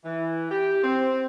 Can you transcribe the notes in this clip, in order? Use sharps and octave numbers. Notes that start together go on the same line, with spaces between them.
E3
G4
C4